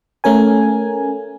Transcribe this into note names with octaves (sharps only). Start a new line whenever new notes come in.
A3 C#4 A#4 G#5